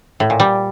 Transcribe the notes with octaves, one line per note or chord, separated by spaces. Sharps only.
A2
A#2
G3